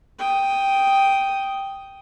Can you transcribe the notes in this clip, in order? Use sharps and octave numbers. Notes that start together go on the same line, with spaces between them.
G5 D#6